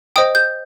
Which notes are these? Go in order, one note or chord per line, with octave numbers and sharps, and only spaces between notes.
C5 D#5 G5 D#6
G6